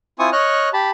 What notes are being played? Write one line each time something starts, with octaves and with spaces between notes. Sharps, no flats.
C4 E4 F4 G#5 C#6 D#6
C#5 D#5 C#6 F6 F#6
G4 A5 B5